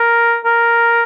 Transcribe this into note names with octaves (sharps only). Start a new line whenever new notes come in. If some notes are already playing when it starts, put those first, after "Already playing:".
Already playing: A#4
A#4